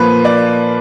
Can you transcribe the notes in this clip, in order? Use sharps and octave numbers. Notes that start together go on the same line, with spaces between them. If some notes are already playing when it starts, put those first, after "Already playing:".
Already playing: A#2 F3 A#3 B4
D5